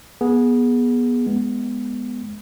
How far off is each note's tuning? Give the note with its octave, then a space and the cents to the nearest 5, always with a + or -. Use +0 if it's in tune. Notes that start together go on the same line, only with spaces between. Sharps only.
B3 -25 G#4 +0
G#3 +5 B3 +0